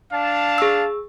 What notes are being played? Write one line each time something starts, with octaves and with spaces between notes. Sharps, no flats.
D4 F5 A5
G#4 E6